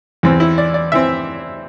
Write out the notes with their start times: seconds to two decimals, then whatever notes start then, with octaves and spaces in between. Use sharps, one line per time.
0.23 E2 E3 C4
0.40 E4
0.58 D5
0.74 D5
0.92 E3 C4 E5